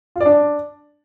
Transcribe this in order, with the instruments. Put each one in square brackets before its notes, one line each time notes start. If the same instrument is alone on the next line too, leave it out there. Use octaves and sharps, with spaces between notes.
[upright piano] F4
D5
D4